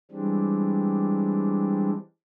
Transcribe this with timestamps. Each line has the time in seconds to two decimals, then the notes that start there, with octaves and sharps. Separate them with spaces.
0.11 E3 G3 G#3 C4 D4